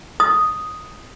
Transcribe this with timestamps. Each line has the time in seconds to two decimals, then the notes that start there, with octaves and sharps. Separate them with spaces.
0.20 D#6